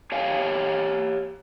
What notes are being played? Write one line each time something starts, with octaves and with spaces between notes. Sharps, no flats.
G4 C#5 F5 G5 G#5